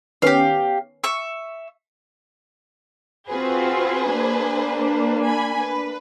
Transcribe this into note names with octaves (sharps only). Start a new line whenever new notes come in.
D#3 B3 C#4 G4 F5
E5 C#6
C4 F4 F#4 G#4 B4 C5
A#3 D4
G#5 B5
B4